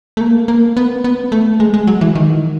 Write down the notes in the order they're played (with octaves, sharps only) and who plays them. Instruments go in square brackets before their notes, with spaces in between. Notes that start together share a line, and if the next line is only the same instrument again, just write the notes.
[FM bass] A3
A#3
A#3
B3
B3
A3
G#3
G#3
F#3
E3
D#3